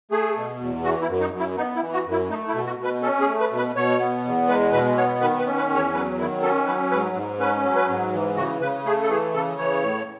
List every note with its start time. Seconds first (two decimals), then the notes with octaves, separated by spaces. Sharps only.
0.11 A3 G#4
0.36 B2
0.60 E2
0.84 E3 F#4
1.02 E4
1.08 F#2
1.21 D#4
1.33 F#2
1.39 E4
1.57 B3 D#4
1.76 E4
1.81 E3
1.93 F#4
2.06 F#2
2.11 E4
2.30 A3 D#4
2.47 E4
2.54 B2
2.66 F#4
2.78 B2
2.84 B4
3.02 C#4 A4
3.21 G#4
3.26 A3
3.40 B4
3.52 B2
3.57 B4
3.76 B2 C#5
4.00 B3
4.24 E2
4.48 G#3 B4
4.72 B2 B4
4.97 B3 C#5
5.21 D#3 B4
5.39 B4
5.46 C#4
5.57 B4
5.70 E2
5.75 C#5
5.94 F#3 B4
6.18 D#3 E4
6.42 C#4 A4
6.66 F#3 B4
6.91 G#2 B4
7.15 G#2
7.40 C#4 B4
7.64 F#3
7.76 B4
7.89 G#2
8.13 E3
8.36 C#3 F#4
8.61 C#3 B4
8.85 A3 G#4
9.03 A4
9.09 E3 G#4
9.34 C#3 A4
9.58 E3 C#5
9.83 A2